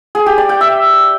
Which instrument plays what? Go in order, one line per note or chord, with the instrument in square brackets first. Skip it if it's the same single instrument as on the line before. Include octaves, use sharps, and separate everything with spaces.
[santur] G#4
G4
D5
G5
E5